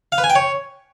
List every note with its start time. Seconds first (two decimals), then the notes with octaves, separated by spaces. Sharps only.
0.12 F5
0.18 B4
0.24 G#5
0.30 G5
0.35 C#5